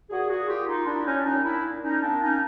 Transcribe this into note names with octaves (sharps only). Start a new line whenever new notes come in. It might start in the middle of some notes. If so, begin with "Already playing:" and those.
A#2 F#4 G#4
F#4 G#4
A#3 F4 G4
D#4 F4
G3 D4 E4
C#4 D#4
D4
A#2 C#4 D#4
D4 E4
A#2
C#4 D#4
A#3 C4 D4
C#4 D#4